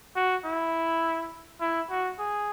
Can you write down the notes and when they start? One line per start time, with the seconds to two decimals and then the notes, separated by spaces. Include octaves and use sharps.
0.16 F#4
0.45 E4
1.61 E4
1.90 F#4
2.19 G#4